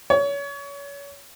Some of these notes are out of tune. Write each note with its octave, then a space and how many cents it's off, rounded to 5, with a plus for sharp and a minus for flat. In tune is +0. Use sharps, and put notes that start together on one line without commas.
C#5 +30